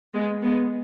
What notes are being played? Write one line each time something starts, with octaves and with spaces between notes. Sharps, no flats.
G#3 B3
G#3 B3